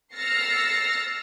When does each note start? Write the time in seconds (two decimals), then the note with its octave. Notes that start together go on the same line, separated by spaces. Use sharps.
0.15 E6 F6 A6 A#6 C7 C#7